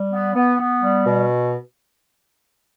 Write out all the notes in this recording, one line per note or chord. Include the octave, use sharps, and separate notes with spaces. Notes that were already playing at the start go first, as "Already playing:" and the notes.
Already playing: G3
B3
B3
B3
G3
B2